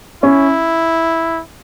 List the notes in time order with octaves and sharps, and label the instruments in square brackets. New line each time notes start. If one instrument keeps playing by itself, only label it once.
[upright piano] C#4 [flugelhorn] E4